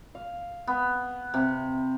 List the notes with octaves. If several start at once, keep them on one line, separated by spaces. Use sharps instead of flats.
F5
B3
C3